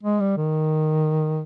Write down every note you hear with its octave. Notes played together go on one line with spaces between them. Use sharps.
G#3
G3
D#3